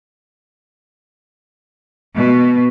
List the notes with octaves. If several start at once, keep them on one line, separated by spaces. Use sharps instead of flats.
B2